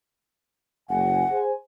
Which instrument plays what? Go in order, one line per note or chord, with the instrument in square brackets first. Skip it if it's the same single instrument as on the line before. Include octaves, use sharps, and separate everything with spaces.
[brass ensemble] F#1 G#5 [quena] F#5
[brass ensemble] G#4 C5 G#5